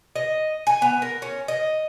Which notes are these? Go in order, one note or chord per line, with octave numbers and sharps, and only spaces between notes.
D#5
G#5
B3
A#4
C#4
D#5